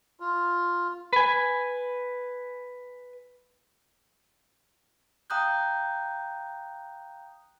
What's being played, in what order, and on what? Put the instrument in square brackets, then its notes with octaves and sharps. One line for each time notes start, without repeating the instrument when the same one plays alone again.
[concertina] F4
[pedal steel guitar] B4 G#5
[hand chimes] F5 G5 A#5 D#6 F#6 G6